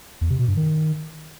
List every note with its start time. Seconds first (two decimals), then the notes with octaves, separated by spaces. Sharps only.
0.21 E2
0.30 C3
0.39 B2
0.48 G2
0.57 D#3